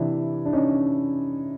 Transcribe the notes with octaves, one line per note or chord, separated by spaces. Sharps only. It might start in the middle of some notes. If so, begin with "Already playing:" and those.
Already playing: C3 E3 D4 E4
D4
C#4 D#4